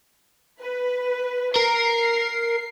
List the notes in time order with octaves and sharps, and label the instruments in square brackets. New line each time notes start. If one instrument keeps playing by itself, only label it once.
[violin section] B4
[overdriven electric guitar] A#4 [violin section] C7